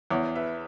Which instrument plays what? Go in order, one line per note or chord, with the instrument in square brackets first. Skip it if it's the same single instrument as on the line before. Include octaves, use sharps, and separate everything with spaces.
[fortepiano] E2 [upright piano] C#5 F#5
[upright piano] B4 E5